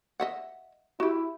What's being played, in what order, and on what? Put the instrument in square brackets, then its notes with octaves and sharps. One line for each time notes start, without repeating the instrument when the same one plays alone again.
[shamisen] D#5 E5 F#5
[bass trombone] E4 [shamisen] F#4 G4